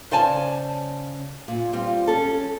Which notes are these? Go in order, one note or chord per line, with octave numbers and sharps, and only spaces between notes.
C#3 C5 D5 G#5 A5
A#2
G3 C4 F4
C#4 A4